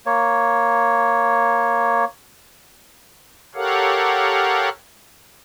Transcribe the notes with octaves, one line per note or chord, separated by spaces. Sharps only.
A#3 C#5
G4 A4 A#4 C#5 F5 F#5